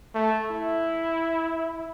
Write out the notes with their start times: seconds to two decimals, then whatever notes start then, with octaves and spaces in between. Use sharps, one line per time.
0.15 A3
0.51 E4